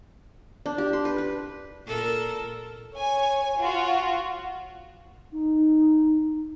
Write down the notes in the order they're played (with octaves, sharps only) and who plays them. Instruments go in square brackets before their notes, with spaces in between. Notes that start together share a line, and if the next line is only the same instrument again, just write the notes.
[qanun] D4
G4
C6
B4
B4
[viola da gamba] A#2 A4 A#4
[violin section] C#5 G#5
F4 F#4
[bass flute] D#4